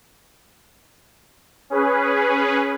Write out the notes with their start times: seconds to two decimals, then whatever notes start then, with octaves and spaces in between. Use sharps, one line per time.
1.70 C#4 G#4 B4